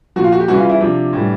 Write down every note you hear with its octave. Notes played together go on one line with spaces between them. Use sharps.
A#2 F3 F4 F#4
F#4
G4
C#3 E3 G3 F#4
F4
E4
C3 F3 D4
A2 E3 G3